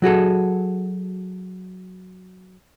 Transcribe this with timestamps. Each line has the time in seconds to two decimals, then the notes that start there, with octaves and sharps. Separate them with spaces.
0.02 F#3 F#4 G#4 A4